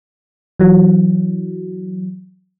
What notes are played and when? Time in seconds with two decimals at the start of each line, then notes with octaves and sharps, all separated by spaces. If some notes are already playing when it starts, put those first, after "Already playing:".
0.60 E3 F#3